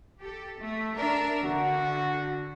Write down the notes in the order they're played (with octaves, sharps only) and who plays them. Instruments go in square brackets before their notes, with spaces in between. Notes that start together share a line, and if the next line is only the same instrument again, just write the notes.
[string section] G4 A4
A3
D4 A#4 E5
[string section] D3 [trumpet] F#4